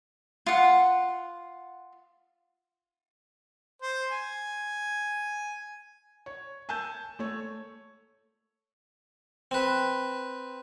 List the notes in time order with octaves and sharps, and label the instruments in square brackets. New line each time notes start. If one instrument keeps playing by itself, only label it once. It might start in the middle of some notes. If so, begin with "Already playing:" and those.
[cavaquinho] F4 F#5
[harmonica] C5
G#5
[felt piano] C#5
G#5 A5 E6 G6
A3 C#5
[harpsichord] C4 B4